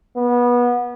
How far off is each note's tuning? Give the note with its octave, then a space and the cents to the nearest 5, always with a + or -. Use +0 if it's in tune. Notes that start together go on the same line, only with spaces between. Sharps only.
B3 -25